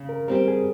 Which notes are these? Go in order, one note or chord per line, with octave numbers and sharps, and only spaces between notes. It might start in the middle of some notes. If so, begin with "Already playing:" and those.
Already playing: C#3
A#4
G3 C4 G4 A#4
G#4